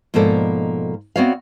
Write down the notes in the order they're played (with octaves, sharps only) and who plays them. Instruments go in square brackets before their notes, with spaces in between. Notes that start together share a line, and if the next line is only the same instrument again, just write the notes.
[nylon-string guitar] G#2 B2 F3 A#3 A4 D5
B3 C4 F#4 C#5 D5 F5